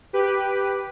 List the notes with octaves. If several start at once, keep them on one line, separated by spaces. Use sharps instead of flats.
G4 B4